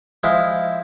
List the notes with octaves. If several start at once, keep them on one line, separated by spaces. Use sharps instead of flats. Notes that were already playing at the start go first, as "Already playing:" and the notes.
F3 G#3 E4